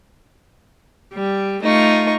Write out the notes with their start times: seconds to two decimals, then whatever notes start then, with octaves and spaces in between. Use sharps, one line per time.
1.14 G3
1.63 A3 D#4 F4 C#6